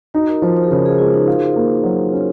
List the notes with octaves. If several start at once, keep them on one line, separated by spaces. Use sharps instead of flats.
D#4 F#4
A#4
F3 C5
C5
G#4
C#3 A#4
G#4
G#3 F4
D#4
F4
A#3
F#3
C#4